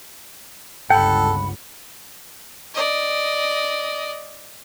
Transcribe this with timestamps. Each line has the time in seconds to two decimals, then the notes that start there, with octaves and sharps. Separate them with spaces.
0.90 G1 C#2 A4 F#5 G5 B5
2.74 D5 D#5